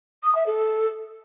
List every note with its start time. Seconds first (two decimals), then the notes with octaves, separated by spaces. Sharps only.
0.23 D#6
0.35 E5
0.46 A4